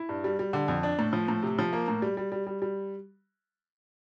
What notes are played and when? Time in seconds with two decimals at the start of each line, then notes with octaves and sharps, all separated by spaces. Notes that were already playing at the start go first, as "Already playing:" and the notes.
Already playing: E4
0.09 G2
0.24 G3
0.39 G3
0.53 D3
0.68 F2
0.83 D4
0.99 A2
1.13 F3
1.28 A2
1.43 C3
1.59 F3
1.73 A#3
1.88 A2
2.02 G3
2.17 G3
2.32 G3
2.47 G3
2.62 G3